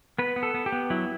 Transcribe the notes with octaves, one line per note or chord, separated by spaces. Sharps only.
B3 B4
B3
A4
B3
G4
B3
F#3 E4